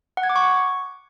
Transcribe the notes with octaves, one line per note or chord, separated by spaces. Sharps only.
F#5
G#6
D6
C#6